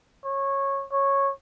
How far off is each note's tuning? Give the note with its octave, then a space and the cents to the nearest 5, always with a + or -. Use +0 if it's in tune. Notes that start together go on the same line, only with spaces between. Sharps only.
C#5 -15
C#5 -10